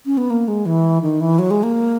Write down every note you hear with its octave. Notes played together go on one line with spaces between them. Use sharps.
C#4
B3
A#3
G#3
E3
D#3
E3
F#3
G#3
A#3